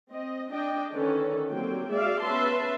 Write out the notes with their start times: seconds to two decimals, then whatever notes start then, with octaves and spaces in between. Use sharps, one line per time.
0.12 C4 D#5
0.52 D4 D#5 G5
0.93 D3 D#3 C#4 A4 B4
1.50 D3 F#3 A#3 C4 G4 G5
1.90 G#3 F#4 G#4 D5 E5 F5
2.22 B3 C#4 B4 E5 A5 C6